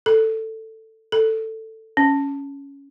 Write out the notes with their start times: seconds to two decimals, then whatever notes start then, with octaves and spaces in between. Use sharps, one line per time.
0.06 A4
1.12 A4
1.97 C#4